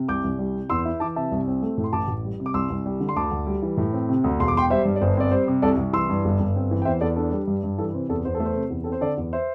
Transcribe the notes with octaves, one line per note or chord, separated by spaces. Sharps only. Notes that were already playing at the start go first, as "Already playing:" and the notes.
Already playing: C3
C2 D6 G6
C2
G3
C3
E2 C6 E6
E4
E3 A5 D6
C3 E5 A5
C2
C4
A3
A2
C6
A1 A5 D6
A1
G3
C3
D6
C2 C6 E6
C2
G3
D3
C6
D2 A5 D6
D2
G3
E3
A2
C4
C3
D2
E1 C6
D6
E1 G5 C6
G3 C5 E5
G2
D5
G1 C5
C4 D5
G3 C5
C3
C2 A4 D5
C2
E3 C6 E6
G2
G1
G1
C4
E3
G5
E2 C5 E5
E2 A4 D5
D4 A4
G3
G2
G2
E3 A4
C3 C5
E2 A4
E2 C5
A4
A3
C5
C3
E2
C4 A4
C5
D3 A4 D5
E2
C5 E5